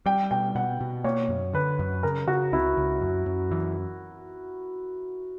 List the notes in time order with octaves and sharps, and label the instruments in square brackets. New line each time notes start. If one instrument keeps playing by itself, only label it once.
[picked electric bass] G3 [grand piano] G5
[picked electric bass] B2 [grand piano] G5
[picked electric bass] B2 [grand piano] F#5
[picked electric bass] B2
[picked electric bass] A#3 [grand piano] C#5
[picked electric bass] F#2
[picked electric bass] D3 [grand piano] B4
[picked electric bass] F#2
[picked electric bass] C#3 [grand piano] A#4
[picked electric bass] C#3 [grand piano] F#4
[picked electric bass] C#2 [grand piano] E4
[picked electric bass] C#2
F#2
F#2
E3